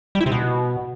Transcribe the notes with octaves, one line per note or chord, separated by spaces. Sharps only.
G3
E4
C3
B2